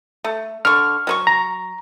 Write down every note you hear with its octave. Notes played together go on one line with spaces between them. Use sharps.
A3
D3 C#6 F6
F#3 B4 C#6
A#5